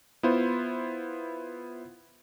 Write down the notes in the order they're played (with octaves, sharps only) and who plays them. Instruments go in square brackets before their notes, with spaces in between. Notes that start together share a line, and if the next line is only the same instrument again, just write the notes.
[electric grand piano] B3 E4 F4 C5